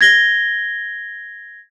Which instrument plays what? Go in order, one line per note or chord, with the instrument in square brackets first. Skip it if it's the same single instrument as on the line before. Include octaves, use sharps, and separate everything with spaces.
[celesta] G#6 A#6 G7